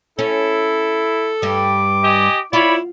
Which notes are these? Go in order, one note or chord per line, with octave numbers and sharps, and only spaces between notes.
C#4 E4 A4
G2 G3 D6
G4 D#5 G#5
E4 F4 C#5 D5 B5